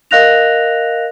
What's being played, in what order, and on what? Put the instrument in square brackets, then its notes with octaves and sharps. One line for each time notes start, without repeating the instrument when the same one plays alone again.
[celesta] A#4 D#5 F5 F#6 A#6 F7